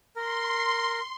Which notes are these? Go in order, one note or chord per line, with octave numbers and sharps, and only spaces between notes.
A#4 C6